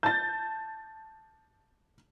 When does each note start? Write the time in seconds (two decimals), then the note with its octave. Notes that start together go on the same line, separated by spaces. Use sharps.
0.03 A5 G6 A6